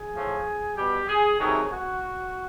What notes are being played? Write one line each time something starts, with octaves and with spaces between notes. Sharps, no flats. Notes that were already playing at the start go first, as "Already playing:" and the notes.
Already playing: G#4
A2 F3 A3
B2 G3 G4
G#4
C3 D#3 F#3 A3 G#4
F#4